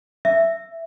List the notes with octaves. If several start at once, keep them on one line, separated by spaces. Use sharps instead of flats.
E5